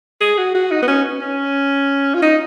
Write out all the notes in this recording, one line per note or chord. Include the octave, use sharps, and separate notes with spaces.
G#4
F#4
F#4
D#4
B3
C#4
C#4
F4
D#4